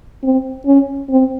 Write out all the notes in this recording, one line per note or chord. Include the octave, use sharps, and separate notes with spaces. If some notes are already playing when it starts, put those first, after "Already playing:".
C4
C#4
C4